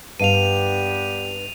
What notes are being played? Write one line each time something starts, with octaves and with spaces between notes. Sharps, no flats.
G2 B3 D4 G4 F5 D#7 F7